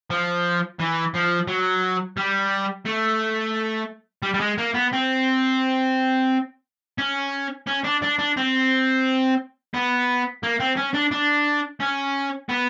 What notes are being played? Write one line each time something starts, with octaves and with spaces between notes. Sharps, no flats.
F3
E3
F3
F#3
G3
A3
G3
G3
G#3
A#3
B3
C4
C#4
C#4
D4
D4
D4
C4
B3
A#3
C4
C#4
D4
D4
C#4
B3